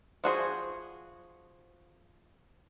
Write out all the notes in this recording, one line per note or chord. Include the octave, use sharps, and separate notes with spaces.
F3 F#4 G#4 C5